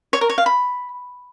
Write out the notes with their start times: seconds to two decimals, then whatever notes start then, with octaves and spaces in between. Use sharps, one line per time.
0.13 C#5
0.21 A#4
0.30 C#5
0.38 F5
0.46 B5